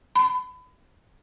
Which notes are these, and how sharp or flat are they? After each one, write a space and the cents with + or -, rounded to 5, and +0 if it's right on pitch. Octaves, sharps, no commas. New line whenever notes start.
B5 +30